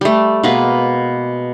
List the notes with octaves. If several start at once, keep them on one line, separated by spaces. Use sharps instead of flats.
G3 A3
B2 G#3 A#3 B4